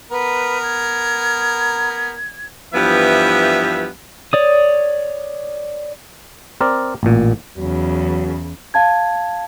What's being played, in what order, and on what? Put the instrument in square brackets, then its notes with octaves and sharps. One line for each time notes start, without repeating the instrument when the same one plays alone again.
[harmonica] B3 A#4 [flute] B4
[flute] G#6
[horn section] G2 E3 F3 B3 E5
[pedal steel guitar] C#5 D5 D#6
[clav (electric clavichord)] C4 A#4 D5
A1 A#2
[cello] E2 C#3 [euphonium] F#3
[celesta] F5 A5 G#6